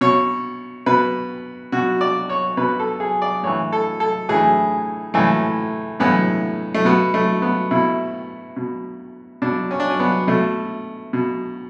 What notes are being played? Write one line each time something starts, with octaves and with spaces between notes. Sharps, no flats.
B2 C#5
B2 B4
B2 F#4
D5
C#5
B2 B4
A4
G#4
D5
A2 E3 C#5
A4
A4
A2 E3 G#4
A2 E3 A3
A2 E3 B3
A3
B2 B3
A3
B3
B2 E4
B2
B2 D4
C#4
D4
C#4
B3
B2 A3
B2